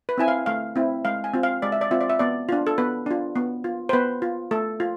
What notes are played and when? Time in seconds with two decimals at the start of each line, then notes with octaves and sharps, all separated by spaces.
0.09 B4
0.18 C4 E4 G#5
0.28 F5
0.46 A3 F5
0.76 C4 E4
1.05 G#3 F5
1.24 G#5
1.34 C4 F4
1.43 F5
1.62 G#3 D5
1.72 E5
1.81 D5
1.91 C4 F4 E5
2.01 D5
2.10 E5
2.19 B3 D5
2.49 D4 F4
2.67 A4
2.78 B3 B4
3.06 D4 F4
3.36 B3
3.64 F4
3.89 C5
3.93 B3 B4
4.22 F4
4.51 A3 A4
4.80 F4